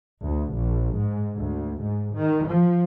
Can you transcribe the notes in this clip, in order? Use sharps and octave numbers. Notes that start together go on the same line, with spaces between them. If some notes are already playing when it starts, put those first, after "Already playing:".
D2
A#1
G#2
D2
G#2
D#3
F3